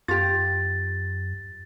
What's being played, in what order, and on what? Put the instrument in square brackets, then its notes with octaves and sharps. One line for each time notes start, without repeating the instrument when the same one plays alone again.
[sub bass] F#2 [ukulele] F4 G4 [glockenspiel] A6